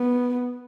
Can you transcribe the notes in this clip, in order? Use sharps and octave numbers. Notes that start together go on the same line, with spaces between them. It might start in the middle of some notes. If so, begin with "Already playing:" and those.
Already playing: B3